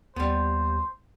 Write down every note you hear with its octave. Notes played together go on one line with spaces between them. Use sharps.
D#2 G3 B3 C5